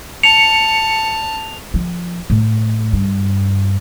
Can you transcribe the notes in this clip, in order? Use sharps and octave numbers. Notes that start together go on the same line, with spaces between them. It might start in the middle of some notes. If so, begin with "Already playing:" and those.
A5 C#7 F7
F3
A2
G2